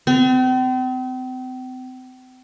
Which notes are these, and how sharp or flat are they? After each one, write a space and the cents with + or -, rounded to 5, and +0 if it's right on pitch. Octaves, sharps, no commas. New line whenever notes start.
C4 -40